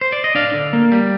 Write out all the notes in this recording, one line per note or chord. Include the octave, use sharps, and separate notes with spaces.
C5
D5
D#5
D4 D5 F5
D3
A#3
G3